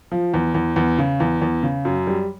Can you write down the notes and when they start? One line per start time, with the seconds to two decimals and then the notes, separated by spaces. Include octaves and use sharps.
0.12 F3
0.34 E2
0.55 E2
0.76 E2
0.99 C#3
1.20 E2
1.42 E2
1.63 C#3
1.85 F#2
2.07 G3